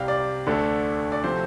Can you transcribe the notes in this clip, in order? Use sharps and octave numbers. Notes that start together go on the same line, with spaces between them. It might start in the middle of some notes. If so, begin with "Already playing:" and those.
Already playing: C2 C3 G3 F5 G5
D5
D2 D3 A3
D5
C3 F3 A3 C4 C5